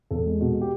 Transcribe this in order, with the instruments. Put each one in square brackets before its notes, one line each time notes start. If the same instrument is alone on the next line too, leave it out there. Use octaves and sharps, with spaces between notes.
[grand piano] E2 A4
G#3
B2
G4